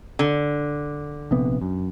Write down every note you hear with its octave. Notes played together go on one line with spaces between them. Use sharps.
D3
A#1 C3 B3
F#2